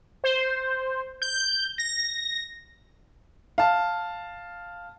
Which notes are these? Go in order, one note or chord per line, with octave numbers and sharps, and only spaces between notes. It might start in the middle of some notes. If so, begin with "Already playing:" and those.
C5
G6
A#6
F5 A5